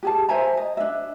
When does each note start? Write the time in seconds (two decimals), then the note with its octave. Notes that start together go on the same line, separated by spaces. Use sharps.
0.03 G4 G#4 A5
0.29 C5 E5 G#5 A#5
0.57 D#5
0.77 D4 E5